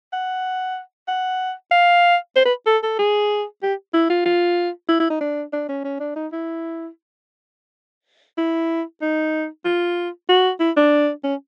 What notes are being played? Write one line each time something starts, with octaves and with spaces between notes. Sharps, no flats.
F#5
F#5
F5
C5
B4
A4
A4
G#4
G4
E4
F4
F4
E4
E4
D#4
D4
D4
C#4
C#4
D4
D#4
E4
E4
D#4
F4
F#4
E4
D4
C#4